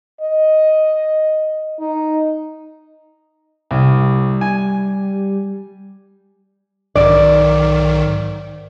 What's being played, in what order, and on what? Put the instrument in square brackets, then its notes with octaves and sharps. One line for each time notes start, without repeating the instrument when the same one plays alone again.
[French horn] D#5
D#4
[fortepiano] C2 [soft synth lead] G3
[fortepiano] G#5
[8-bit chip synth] B1 G#2 D#3 [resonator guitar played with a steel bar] D5